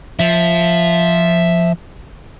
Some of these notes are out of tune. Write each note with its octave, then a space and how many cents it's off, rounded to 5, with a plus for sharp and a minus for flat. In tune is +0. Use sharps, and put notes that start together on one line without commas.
F3 +0 E5 +0